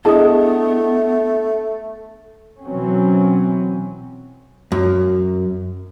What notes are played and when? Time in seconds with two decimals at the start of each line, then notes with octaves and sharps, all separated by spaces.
0.05 A3 B3 D4 E4 G#4 D#5 A5 D#6
2.62 B2 E3 F#3 C4 C#4
4.72 F#2